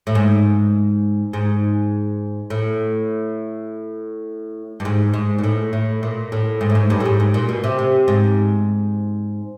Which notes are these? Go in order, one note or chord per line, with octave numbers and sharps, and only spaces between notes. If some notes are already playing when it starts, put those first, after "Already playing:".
A2
G#2
G#2
A2
G2
G#2
G#2
A#2
A2
A2
A#2
A2
G#2
A2
G#2
G2
A2
G#2
G#2
A#2
B2
C3
C3
G#2